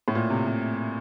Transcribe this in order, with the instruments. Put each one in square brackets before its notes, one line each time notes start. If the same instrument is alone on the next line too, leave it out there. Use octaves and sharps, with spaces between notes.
[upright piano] A2
A#2
C3
C3